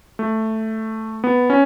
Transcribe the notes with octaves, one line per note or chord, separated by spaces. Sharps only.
A3
B3
C#4